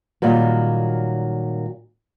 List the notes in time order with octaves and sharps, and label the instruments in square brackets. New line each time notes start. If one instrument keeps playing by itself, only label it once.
[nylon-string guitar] A#2 D#3 F#3 G3